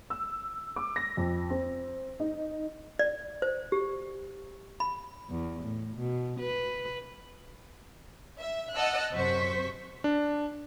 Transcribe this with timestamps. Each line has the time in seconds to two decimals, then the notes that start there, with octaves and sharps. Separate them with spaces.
0.10 E6
0.76 D6
0.96 A#6
1.17 F2
1.50 C4
2.20 D#4
2.99 D5
3.42 C5
3.72 G4
4.80 B5
5.30 E2
5.64 A2
5.96 B2
6.40 B4
8.39 E5
8.73 D#5 F#5 A5 E6 F#6
9.12 F#2 C3 C5 C#6 B6
10.04 D4